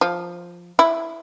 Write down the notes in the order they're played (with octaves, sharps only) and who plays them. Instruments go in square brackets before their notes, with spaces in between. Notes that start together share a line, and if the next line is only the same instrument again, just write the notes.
[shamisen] F3
E4